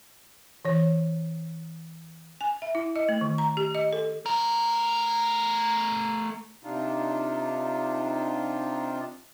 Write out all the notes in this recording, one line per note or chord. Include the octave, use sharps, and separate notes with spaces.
E3 C#5
G#5
E5
E4
D#5
A3
D#3
A#5
G4
D#5
A4
A3 A#4
C3 D4 D#4 F4